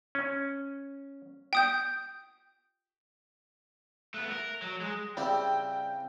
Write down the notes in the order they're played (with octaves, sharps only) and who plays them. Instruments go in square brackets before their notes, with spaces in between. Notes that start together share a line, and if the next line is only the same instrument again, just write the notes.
[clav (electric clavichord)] C#4
[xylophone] G5 D#6 G6
[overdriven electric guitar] A3 B3 [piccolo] F#6
[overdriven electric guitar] A#4
F#3
[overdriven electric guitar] G#3 [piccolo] F#6
[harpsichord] C#3 C4 E4 [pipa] G3 [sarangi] G5